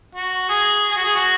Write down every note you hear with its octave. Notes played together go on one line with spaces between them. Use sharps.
F#4
G#4
G#4
F#4
G#4
F#4